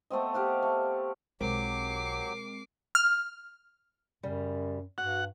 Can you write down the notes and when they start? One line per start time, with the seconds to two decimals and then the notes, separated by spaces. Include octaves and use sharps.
0.10 A3 B3 C4 D#5
0.34 G4 F5 F#5
0.62 A3
1.41 B1 F#3 G#3 C4 G4 A#4 D6 C7
2.95 F6
4.23 F#2 C#3 G3
4.98 G2 F#4 F#5